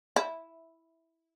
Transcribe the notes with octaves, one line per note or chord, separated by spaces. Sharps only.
E4